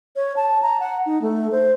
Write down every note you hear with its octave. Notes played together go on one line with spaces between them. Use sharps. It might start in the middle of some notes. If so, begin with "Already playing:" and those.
C#5
A5
A#5
F#5
D#4
A3
C5